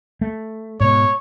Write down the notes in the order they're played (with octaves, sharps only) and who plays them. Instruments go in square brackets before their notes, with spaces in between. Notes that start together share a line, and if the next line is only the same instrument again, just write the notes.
[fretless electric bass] A3
[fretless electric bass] G#2 B2 [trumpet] C#5